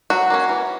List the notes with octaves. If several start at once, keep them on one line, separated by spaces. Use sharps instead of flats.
F#3 F#4
A#3 C#4
E3